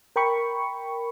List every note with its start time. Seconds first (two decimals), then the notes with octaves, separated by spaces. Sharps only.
0.16 A#4 G5 B5 C#6